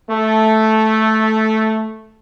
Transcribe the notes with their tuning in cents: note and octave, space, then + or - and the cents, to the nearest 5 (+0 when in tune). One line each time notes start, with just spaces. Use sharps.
A3 -5